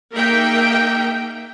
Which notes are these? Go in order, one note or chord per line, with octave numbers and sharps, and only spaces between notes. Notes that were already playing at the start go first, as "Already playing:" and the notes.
A#3 D#4 G#4 A#4 E5 G5